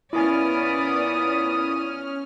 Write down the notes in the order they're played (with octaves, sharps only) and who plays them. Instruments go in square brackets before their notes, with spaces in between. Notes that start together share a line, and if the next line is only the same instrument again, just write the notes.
[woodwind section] A#2 D#6 [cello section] B3 D5 [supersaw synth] C#4 F6 [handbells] E4 G#5